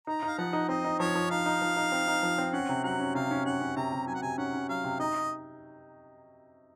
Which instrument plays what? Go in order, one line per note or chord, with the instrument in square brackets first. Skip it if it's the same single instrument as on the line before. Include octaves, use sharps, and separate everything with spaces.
[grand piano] D#4 [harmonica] A#5
[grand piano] D#4 [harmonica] F5
[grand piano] F3 [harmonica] F#5
[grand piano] D#4
[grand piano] C4 [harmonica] D#5
[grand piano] D#4
[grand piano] F3 [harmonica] C#5
[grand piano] F3
[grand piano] D#4 [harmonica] F5
[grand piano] D#4
F3
D#4
C4
D#4
F3
C4
[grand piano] C#4 [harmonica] F#5
[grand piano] C3
[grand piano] F#3 [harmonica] F#5
[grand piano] C#4
[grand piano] C3 [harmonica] F5
[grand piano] C#4
[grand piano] C#4 [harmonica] F#5
[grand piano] C#4
[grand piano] C3 [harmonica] A#5
[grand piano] C3
[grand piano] F#3 [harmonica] G#5
[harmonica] F#5
[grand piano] C3 [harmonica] G#5
[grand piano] C#4 [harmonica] F#5
[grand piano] C#4
[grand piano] F#3 [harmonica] F5
[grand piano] C3
[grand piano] D#4 [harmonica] D#5